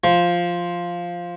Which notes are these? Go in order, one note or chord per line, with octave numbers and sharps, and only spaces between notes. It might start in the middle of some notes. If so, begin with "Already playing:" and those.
F3